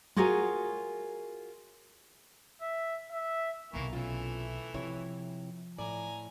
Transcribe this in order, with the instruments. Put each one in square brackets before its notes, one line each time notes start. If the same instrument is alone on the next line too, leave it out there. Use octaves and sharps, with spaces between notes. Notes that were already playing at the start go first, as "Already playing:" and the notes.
[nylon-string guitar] F4 F#4 G#4 A#4 C#5 G#5
[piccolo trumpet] E5
E5
[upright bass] B1 C3 [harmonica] E3 A#3 C#6
[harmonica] E3 A3 [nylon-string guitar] C#4 F4
[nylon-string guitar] C3 E4 C#5 [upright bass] F3
[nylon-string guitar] A2 D5 [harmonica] G#5 A#5